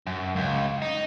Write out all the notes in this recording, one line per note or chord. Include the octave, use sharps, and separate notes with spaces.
F#2
C#2
D#4